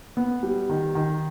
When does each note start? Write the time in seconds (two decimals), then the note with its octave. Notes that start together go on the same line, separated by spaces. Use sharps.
0.17 B3
0.43 G3
0.69 D#3
0.95 D#3